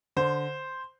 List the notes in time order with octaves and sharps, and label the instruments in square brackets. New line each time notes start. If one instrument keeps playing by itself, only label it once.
[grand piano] D3 C5